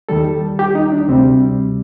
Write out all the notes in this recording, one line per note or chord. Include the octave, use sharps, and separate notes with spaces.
D#2 D#3 G3 A4
G4
D#4
D4
D2 C3 G3 C4